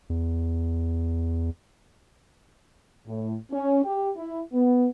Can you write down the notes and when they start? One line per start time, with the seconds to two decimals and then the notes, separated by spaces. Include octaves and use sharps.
0.10 E2
3.07 A2
3.52 C#4
3.85 G4
4.17 E4
4.53 B3